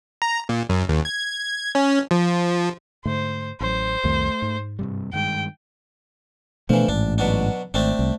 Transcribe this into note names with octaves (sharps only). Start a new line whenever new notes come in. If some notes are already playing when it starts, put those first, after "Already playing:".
A#5
A#2
F#2
D#2
G#6
C#4
F3
G#2 D3 A3 C5
A1 F#3 C5
C2 F2 D#3 A3
G#2
G2 C3 G3
G2 D#3 G#3 G5
B2 E3 F3 A3 D4
A1 G#2 D4
B2 F#3 D4
G#1 A3 C4 D4
C2